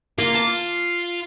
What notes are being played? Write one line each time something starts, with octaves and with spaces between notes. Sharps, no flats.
A#3 F4
A5